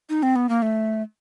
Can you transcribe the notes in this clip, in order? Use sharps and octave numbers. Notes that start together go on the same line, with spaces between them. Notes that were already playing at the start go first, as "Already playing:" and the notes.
D#4
C4
B3
A#3
A3